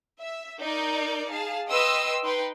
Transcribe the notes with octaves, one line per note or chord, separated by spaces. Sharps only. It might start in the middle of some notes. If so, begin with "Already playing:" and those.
E5
D#4 A#4 D5 G6
G#4 F5 A5
B4 D#5 G5 C6 D#6 E6
D#4 B4 G5 C6